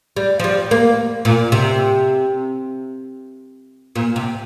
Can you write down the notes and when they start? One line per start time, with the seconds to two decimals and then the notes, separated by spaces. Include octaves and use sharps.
0.16 G3
0.40 F3
0.44 G3
0.71 A#3
1.25 A#2
1.52 C3
3.96 A#2
4.16 C3